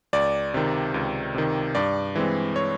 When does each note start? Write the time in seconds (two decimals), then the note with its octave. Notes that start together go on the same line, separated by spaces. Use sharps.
0.13 C#2 D5
0.54 C3 D#3
0.94 C#2
1.34 C3 D#3
1.75 G2 D5
2.15 E3 G#3 C4
2.56 C#5